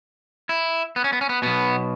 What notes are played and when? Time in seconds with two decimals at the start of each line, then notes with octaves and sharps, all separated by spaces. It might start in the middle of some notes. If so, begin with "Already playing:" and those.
0.49 E4
0.96 B3
1.04 C#4
1.13 B3
1.21 C#4
1.29 B3
1.42 B1 B2 B3